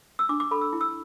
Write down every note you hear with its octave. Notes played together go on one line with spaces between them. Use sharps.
E6
D4 D6
D6
A4 B5
E6
E4
E6